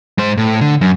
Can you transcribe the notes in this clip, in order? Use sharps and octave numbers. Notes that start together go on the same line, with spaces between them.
G#2 C5
A2
D3
F#2